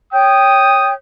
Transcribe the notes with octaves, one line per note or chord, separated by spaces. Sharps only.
C#5 G5 D#6 G6